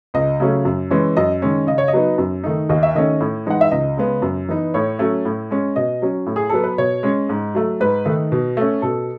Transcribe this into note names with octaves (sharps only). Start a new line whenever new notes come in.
C#2 D#5
C#3 F#3 A3 C#4
F#2
E3 G#3 C#4
F#2 D#5
D#3 G#3 C#4
C#3 D#5
C#5
D#5
F#3 B3 D#4
F#2
D#3 A3 D#4
D#2 D#5
E5
D#3 A3 C#4 D#5
A2
E3 G#3 D#4 F#5
E5
C#2 D#5
C#3 G#3 B3
F#2
E3 B3 D#4
A2 C#5
F#3 A3 C#4
A2
G#3 C#4
B2 D#5
F#3 C#4
A2
G#4
F#3 B3 A4
B4
B2 C#5
G#3 C#4
G#2
F#3 A3
G#2 B4
D#3 A3 D#4
B2
A3 C#4
B2 A4